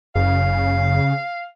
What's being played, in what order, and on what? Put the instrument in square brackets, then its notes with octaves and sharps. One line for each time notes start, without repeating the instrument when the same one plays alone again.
[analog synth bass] F#1 [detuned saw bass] C#3 [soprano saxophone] F5